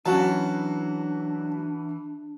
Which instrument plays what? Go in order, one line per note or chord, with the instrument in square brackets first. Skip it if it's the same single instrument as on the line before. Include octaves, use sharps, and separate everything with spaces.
[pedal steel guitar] E3 [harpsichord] F#3 [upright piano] C#4 F#4 A5 [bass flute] D4